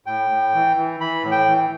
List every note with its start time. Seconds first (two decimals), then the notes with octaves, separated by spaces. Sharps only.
0.06 A2 G5
0.30 A2
0.54 E3
0.77 E3
1.00 E3 B5
1.23 A2
1.31 G5
1.48 E3